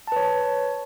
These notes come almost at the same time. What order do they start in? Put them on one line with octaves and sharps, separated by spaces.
A5 B4 C#5